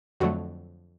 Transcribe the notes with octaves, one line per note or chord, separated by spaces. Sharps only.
F2 D3 F#3 A3 F#4